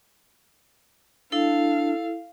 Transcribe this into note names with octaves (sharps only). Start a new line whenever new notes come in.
D4 E4 A4 F5